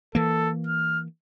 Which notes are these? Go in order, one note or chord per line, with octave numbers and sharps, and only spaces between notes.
E3 A#3 A4
F6